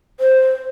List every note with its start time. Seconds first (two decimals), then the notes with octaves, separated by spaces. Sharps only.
0.20 C5